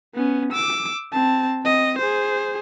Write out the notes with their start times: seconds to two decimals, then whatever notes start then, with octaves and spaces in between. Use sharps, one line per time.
0.14 B3 C#4
0.52 D6 E6
1.13 C4 A5
1.64 C4 D#5
1.98 G#4 C5